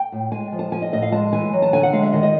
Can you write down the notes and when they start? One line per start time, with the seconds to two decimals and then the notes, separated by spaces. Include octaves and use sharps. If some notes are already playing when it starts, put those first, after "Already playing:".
Already playing: G5
0.12 A2
0.32 G#3 G#5
0.52 F3
0.59 A5
0.72 F3 G#5
0.82 D#5
0.92 A2 D#5
1.02 F5
1.12 G#3 A5
1.33 E3 G#5
1.53 F#3
1.62 A5
1.72 D3 G#5
1.83 F#5
1.93 G#3 F5
2.03 E5
2.12 D#3 D#5
2.23 D#5